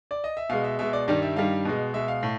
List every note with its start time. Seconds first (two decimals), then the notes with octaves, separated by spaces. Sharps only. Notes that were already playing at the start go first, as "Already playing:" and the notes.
0.11 D5
0.24 D#5
0.37 E5
0.50 B2 G#3 F5
0.64 E5
0.79 B2 G#3 E5
0.93 D5
1.08 G2 D#3 G3 D5
1.22 E5
1.36 G2 D#3 G3 F5
1.65 B2 G#3
1.94 B2 G#3 E5
2.08 F5
2.23 A2